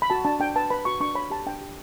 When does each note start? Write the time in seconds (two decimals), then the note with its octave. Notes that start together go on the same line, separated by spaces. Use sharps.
0.02 B5
0.10 F#4 A5
0.25 D4 A5
0.40 D4 G5
0.56 B4 A5
0.70 B4 B5
0.85 F#4 C#6
1.00 D4 C#6
1.15 C#5 B5
1.30 G4 A5
1.46 D4 G5
1.61 G4